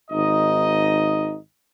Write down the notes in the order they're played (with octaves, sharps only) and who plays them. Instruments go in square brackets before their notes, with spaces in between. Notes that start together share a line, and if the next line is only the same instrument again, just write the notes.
[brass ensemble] G#1 D#4 D#5